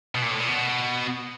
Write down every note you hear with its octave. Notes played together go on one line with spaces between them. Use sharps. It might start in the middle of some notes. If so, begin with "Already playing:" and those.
B2
A#2
A2
A#2
B2